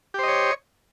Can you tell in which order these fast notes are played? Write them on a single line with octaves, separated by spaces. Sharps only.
G4 C5 D#5 C#5